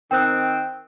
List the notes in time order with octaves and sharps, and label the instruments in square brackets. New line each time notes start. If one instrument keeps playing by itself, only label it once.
[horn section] D#3 C4 [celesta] G5 F#6